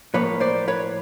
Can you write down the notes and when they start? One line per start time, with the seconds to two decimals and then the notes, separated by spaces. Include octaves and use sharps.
0.14 A2 F3 A#3 B4 C#5
0.40 C5 D5
0.68 B4 C#5